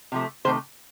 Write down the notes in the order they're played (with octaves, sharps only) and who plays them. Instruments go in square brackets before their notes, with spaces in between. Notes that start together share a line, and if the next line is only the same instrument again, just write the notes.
[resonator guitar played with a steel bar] C3 F3 A3
C3 D#3 A3 C5